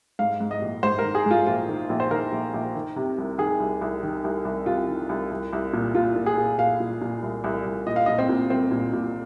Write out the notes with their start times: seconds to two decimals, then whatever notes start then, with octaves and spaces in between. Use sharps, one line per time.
0.19 G#2 F5
0.40 G#2
0.51 D#5
0.61 A#1
0.83 G#2 C5
0.99 A#4
1.04 D#3
1.15 G#4
1.26 G#2
1.31 F4
1.47 A#1 F4
1.68 D#3
1.90 A#1
2.00 C5
2.11 D#3 A#4
2.32 A#1
2.54 A#1
2.75 D#3
2.96 C3
3.18 C2
3.38 D#3 G#4
3.60 C2
3.81 C2
4.03 D#3
4.24 C2
4.45 C2
4.66 C3 F4
4.88 D#3
5.09 C2
5.31 C2
5.53 C2
5.73 A#2
5.94 A#2 F4
6.16 A#2
6.26 G#4
6.37 A#2
6.59 A#2 F5
6.80 A#2
7.01 A#2
7.22 C2
7.44 C2
7.66 C2
7.86 A#2 D#5
7.96 F5
8.06 A#2 D#5
8.18 C4
8.29 A#2
8.50 C2 C4
8.71 A#2
8.93 A#2